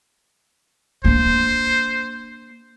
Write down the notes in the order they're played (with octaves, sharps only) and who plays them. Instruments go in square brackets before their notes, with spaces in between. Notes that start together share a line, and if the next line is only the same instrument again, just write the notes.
[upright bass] A#3 D4 [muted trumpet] C5